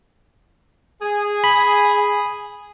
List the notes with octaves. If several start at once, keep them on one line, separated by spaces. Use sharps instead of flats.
G#4
B5